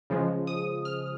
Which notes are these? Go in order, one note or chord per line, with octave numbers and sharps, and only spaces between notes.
C#3 F3 G#3
D#6
F6